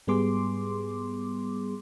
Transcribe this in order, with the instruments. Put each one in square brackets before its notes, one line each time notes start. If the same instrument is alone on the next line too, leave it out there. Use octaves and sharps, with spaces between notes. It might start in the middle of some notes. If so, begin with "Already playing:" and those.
[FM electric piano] G#2 G3 B3 G#4 C6 D6